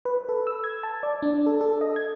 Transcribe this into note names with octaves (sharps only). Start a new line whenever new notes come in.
B4
A4
E6
G#6
A5
D5
D4
A4
A4
D#5
G#6